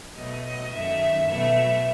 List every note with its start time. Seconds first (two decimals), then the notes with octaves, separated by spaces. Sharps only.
0.15 B2 F#3 A3 D#5
0.44 D#5
0.72 F#2 D#3 A3 E5
1.29 B2 F#3 A3 E5